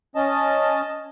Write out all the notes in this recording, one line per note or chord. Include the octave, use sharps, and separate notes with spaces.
C#4 D#5 A5